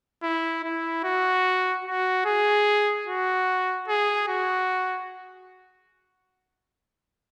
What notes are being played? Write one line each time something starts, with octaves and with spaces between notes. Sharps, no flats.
E4
E4
F#4
F#4
G#4
F#4
G#4
F#4